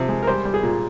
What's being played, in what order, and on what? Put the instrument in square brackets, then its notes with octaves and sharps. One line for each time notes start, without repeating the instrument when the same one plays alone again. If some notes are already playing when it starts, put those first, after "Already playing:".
Already playing: [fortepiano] C3 F3
G#3
A#4
G3 C5
G3
G#4
A#2